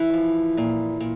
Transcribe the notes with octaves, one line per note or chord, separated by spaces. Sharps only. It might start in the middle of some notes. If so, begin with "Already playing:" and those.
Already playing: E3 E4
F3
A#2
A#2